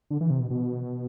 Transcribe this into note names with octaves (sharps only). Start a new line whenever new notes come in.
D3
E3
C3
B2
B2